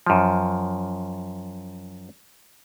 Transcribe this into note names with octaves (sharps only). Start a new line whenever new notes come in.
F#2 F3